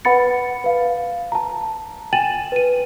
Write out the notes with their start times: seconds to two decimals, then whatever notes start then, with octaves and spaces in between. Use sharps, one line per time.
0.05 B4 F#5 B5 A6 C#7
0.64 B4 F5
1.32 A5 A#5
2.13 G5 G#5 A6 D#7 E7 F#7
2.52 B4 D#7